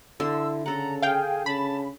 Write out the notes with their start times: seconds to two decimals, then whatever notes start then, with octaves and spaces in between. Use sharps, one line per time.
0.20 D3 E4 C6 E6
0.66 C#3 A4 F#5 A#5
1.02 G#4 F5 G5
1.46 C#3 A5 B5